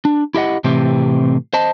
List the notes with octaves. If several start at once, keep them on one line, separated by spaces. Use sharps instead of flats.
D4
E4 G4 D#5 F#5
A2 C3 E3 C4 G4
C5 D#5 A5